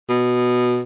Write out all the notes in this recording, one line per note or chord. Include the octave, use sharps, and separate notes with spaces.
B2